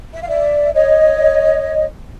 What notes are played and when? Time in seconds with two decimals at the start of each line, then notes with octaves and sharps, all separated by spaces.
0.13 E5
0.21 F5
0.29 D5 E5
0.74 C#5 D#5